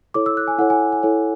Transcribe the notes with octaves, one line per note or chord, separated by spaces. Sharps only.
E4 A4 C#5 D6
E6
F#6
G#5
E4 A4 C#5 F#5
G#5
G#5
E4 A4 C#5